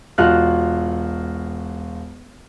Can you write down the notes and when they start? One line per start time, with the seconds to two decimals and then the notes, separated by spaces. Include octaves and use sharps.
0.18 E1 F4 F#4 F6 F#6